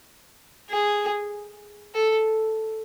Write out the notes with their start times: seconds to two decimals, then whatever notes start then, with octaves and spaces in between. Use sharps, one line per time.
0.70 G#4
1.95 A4